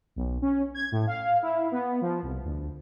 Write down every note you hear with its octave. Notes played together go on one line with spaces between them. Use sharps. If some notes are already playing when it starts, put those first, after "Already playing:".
B1
C#4
G#6
A2
F5
E4
B3
F3
C2
D2